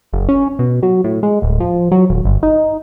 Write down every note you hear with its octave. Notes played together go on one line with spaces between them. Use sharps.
F#1
C#4
B2
F#3
A2
G#3
D1
F3
F#3
D#1
G1
D#4